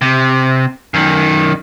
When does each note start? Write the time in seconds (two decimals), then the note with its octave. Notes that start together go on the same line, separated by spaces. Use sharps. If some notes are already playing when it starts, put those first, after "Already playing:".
0.01 C3
0.94 F#2 D#3